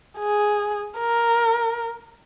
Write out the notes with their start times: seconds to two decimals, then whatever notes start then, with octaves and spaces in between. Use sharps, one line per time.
0.19 G#4
0.98 A#4